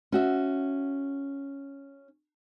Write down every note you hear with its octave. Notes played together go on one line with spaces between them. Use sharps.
C#4 F#4 E5